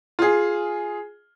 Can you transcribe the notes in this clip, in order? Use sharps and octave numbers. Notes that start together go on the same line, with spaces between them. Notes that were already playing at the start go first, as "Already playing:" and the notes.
F4 G#4